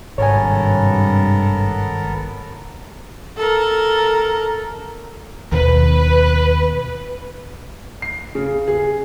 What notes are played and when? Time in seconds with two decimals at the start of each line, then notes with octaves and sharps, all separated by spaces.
0.18 G#1 G2 C3 B3 A4 A#4 C#5 G#5
3.37 A4 A#4
5.52 D#2 B2 B4
8.02 C7
8.35 C#3
8.68 G#4